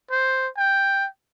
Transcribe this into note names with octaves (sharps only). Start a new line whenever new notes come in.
C5
G5